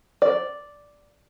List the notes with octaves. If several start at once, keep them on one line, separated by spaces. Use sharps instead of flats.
D5